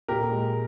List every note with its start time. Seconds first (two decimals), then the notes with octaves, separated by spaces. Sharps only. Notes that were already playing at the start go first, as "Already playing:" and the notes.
0.08 A#2 G4 A#4
0.31 G#3